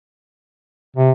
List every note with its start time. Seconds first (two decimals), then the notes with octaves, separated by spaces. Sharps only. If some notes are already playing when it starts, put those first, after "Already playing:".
0.96 C3